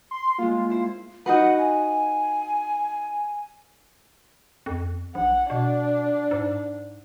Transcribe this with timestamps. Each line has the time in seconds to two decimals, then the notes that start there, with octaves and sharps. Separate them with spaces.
0.11 C6
0.38 G#3 A#3 F4
0.70 E4 C5
1.26 D#4 F#4 B4 F#5
1.58 G#5
4.66 F2
5.15 A#1 F#5
5.50 B2 D4
6.31 G#2